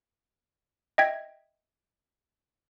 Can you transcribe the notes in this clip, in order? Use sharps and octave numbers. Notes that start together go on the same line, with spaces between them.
D#5 E5 G5 G#6 B6